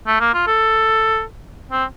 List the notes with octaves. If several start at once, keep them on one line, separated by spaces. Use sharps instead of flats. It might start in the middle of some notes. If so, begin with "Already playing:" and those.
A3
A#3
F4
A4
C4